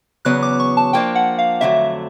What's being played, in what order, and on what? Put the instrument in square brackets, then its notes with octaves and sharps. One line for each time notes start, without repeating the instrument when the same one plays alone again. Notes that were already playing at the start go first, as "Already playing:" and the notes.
[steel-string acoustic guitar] E2 C#3 F#3 B3 [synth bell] F#6
[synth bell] D6
C#6
A5
[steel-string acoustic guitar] F3 A#3 D4 [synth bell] G5
[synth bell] F#5
F5
[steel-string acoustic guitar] F2 D3 F#3 A3 [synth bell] E5